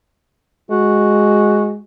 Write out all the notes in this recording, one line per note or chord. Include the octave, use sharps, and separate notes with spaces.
G#3 F#4